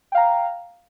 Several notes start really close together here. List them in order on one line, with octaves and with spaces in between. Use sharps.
G5 F5 A#5